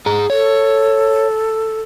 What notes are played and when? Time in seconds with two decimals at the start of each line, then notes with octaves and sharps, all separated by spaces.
0.06 G#4 A#5
0.30 A4 C#5